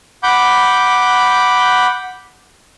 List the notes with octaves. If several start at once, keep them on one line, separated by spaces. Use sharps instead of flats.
F#5 B5 D6 G6